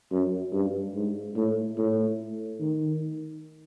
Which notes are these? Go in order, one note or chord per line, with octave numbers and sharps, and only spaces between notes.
F#2
G2
G#2
A2
A2
D#3